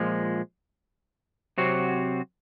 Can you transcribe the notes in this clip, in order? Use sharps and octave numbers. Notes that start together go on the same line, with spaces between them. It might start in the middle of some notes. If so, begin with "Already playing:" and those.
Already playing: A#2 F3 G#3
C3 F#3 C4 F#4